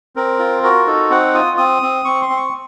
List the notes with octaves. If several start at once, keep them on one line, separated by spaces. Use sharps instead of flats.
C4 A#4
F4
F#4 A#4
D#4 A4
C4 F#5
F4 D#6
C4 D#6
C4
C4 C#6
C6
C4
C#6